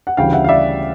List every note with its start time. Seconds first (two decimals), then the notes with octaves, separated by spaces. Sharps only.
0.07 F#5
0.17 D2 C#3 E3 G3 F5 G5
0.33 E5 F#5
0.44 F5
0.49 D5 E5